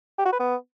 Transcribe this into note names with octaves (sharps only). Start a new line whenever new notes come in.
G4
F#4
B4
B3